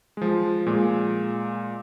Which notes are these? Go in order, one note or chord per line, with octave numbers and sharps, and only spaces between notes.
F3 G#3
A#2 G#3